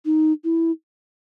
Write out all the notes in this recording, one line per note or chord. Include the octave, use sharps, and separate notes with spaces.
D#4
E4